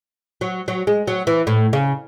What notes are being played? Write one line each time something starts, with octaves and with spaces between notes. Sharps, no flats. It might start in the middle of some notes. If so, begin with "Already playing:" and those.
F#3
F#3
G#3
F#3
E3
A2
C#3